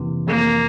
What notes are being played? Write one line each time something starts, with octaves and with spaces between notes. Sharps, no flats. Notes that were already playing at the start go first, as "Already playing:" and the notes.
Already playing: F2 C3 E3 A#3
F2 A#3